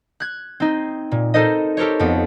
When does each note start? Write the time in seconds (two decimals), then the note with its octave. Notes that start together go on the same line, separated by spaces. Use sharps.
0.20 F#6 G#6
0.60 C4 D#4
1.12 A#2
1.34 D#4 A4 A#4 C5 D#5
1.77 G4 A4 A#4 C5 C#5
1.99 F2 B3